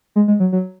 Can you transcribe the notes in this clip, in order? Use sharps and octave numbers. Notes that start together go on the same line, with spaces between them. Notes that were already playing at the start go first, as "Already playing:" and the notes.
G#3
G#3
F#3
F#3